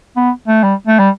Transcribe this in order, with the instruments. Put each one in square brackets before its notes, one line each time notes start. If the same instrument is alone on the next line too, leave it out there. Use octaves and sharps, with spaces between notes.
[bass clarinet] B3
A3
G3
A3
G3